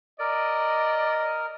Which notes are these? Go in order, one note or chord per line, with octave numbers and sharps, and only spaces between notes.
A#4 D5 D#5